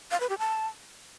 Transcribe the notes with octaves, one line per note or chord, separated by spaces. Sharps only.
F5
B4
G4
A5